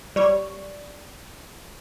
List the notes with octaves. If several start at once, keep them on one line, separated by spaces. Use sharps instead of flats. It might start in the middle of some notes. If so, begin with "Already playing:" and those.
G3 C#5 D5